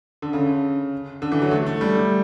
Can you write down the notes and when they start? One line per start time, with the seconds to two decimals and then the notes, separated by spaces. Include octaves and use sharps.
0.22 D3
0.33 C#3
1.22 D3
1.32 E3
1.42 F#3
1.51 A3
1.66 A3
1.81 G3